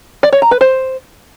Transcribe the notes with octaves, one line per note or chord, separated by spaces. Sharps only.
D5
C#5
A#5
B4
C5